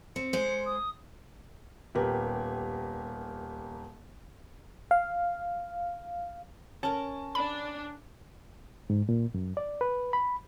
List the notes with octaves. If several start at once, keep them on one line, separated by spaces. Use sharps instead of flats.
C4 C#7
G#3 C5
D#6
D#1 B3 G4 A#4 B4
F5
C#4 A#4 A5
D4 B5
G#2
A#2
F#2
D5
B4
B5